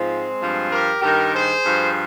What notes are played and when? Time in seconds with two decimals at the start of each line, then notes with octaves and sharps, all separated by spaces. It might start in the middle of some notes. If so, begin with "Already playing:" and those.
Already playing: G#2 F3 G#3 C4
0.40 G2 F3
0.70 G4 A#4
1.02 G2 D#3 G4 A#4
1.33 G#4 C5
1.63 G2 F3